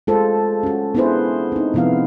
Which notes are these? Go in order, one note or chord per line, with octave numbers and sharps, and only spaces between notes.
G#3 F4 A4 C5
C#4 F#4
B3 D4 E4 G#4 B4 C5
C4 D#4
C3 F3 B3 E4 F5